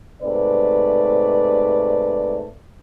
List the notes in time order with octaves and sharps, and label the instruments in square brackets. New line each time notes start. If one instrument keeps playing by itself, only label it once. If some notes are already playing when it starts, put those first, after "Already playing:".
[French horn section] G#2 C3 A3 B4 D5